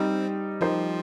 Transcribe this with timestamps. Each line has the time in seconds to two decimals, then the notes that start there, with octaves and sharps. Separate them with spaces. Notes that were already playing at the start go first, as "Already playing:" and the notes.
Already playing: G3 C4 D#4 C5
0.61 F3 G3 D#4 C5